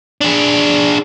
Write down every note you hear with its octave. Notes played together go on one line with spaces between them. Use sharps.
D4 G#4